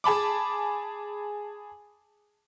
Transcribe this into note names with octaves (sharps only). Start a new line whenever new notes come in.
G#4 A5 B5 D6